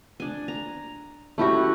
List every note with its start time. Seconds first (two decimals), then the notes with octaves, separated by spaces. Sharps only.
0.20 D4 G#5
0.48 A#5
1.38 A3 C#4 E4 F#4 G4